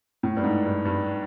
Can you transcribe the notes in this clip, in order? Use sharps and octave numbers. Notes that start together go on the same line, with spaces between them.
A2
G2
G#2
G2
G2